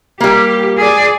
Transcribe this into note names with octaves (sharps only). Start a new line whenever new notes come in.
G3 A#3 G4
G#4 D5